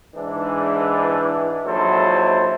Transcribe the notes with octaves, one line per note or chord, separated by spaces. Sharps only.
G#2 E3 D4
A#1 G#2 F#3 E4 A4 C5